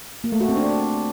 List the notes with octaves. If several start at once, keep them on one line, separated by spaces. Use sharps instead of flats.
A#3
A3
F#4
C4
D4